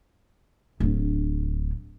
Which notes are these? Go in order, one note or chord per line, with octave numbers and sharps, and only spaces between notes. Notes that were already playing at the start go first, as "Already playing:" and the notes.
D1 D4